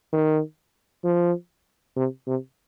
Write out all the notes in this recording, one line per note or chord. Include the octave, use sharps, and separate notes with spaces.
D#3
F3
C3
C3